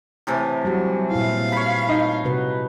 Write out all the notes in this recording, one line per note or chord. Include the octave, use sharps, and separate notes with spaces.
A2 C3 E3
F#3 G3 F#4 G4
A#2 E4 F4 F5
C#5 B5
D#4
C3 F#4 B4